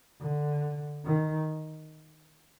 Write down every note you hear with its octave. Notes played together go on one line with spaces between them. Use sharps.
D3
D#3